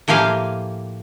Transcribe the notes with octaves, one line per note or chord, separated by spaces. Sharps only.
A2 F3 A#3 G4 F5 G#5